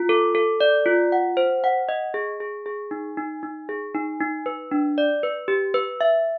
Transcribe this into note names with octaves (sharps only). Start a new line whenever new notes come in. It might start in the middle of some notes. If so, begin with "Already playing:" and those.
Already playing: F4
A4
A4
D5
F4
F#5
C5
F#5
D#5
G#4
G#4
G#4
D#4
D#4
D#4
G#4
D#4
D#4
B4
D4
D5
B4
G4
B4
E5